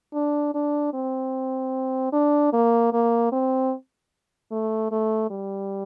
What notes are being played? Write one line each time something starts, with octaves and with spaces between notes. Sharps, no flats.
D4
D4
C4
D4
A#3
A#3
C4
A3
A3
G3